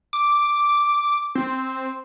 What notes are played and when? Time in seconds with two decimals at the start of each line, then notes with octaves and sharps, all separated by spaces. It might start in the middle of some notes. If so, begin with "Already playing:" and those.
0.13 D6
1.35 C4